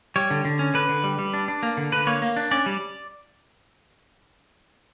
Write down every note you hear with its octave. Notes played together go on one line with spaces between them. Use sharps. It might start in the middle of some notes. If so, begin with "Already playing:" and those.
G3 C#5
D3
D3
C#4
D3 B4
D3
G3
G3
D4
D4
A#3
D3
D3 B4
A#3 C#5
A#3
D4
C#4 D5
G3